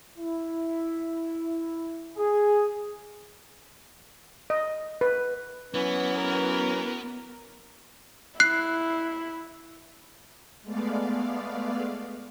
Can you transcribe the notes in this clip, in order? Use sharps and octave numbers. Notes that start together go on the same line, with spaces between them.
E4
G#4
D#5
B4
E3 F#3 B3 C#4
A#4
E4 F#6 C7
G#3 A3 B3 D5 F5